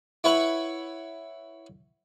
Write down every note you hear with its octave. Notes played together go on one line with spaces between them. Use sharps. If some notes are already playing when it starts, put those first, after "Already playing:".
E4 B4 C#5 F#5